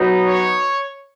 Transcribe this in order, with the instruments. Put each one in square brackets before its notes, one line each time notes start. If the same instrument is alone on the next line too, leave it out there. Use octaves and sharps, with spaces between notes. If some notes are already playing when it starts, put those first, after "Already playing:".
Already playing: [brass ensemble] F#3 B3 D#4
C#5